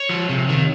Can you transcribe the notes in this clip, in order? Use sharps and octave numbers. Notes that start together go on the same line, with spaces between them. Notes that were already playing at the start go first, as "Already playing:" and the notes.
Already playing: C#5
F3
C3
D#3